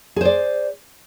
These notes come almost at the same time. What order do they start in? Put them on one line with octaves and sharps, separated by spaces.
G#4 C5 D5